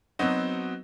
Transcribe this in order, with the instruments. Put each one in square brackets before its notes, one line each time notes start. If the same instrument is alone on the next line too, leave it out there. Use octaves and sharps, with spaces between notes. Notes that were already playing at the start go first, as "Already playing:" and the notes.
[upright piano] F#3 B3 C4 D#4 F#4